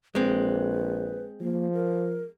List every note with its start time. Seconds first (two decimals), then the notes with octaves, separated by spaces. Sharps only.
0.15 A#1 G#3 C4 B4
1.41 F3 A#3
1.73 A#4